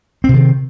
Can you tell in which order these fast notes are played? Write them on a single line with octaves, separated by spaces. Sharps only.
C4 C3 D#3